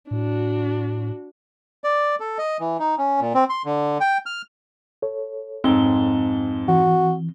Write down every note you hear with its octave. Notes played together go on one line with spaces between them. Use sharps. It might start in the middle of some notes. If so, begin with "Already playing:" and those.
A2 D4 F#4
D5
A4
D#5
E3
D#4
C#4
A#2
C4
C6
D3
G5
F6
A4 C#5
F2 G#2 C4 G7
E3 F#4